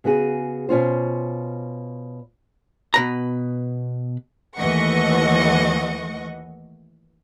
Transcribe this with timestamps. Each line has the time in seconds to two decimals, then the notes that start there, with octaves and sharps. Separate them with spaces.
0.04 C#3 B3 F#4 G#4
0.69 B2 C#4 F4 C5
2.94 B2 B4 A#5
4.57 D#2 E3 A3 D#5 F#5 C#6